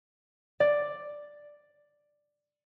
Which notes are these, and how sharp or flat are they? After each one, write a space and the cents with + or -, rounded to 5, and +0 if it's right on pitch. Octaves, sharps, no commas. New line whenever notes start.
D5 +5